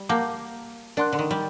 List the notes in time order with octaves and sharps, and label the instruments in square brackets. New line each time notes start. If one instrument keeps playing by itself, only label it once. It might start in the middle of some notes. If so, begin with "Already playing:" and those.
Already playing: [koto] G3
[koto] A#3 [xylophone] F#5 A5 D6 G6
[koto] D4 [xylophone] A#4 D5 F#5 C6 F#6
[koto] D3
D#3
G3